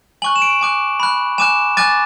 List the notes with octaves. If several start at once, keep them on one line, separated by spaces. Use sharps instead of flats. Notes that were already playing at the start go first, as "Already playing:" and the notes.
G#5 C#6 F#6 F#7
E7
D7
G#5 D6 F#6
B5 F#6
G#5 D6 F#6 E7
G#5 D6 F#6 A6